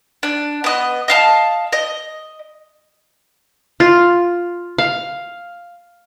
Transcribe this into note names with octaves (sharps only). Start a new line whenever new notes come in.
D4
B3 D#5
D#5 F5 A5
D#5
F4
F5